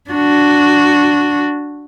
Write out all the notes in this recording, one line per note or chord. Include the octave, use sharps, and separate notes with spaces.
D4 F#4